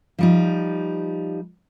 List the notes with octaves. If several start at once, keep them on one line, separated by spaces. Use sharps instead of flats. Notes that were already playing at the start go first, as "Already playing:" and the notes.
F3 G3 D#4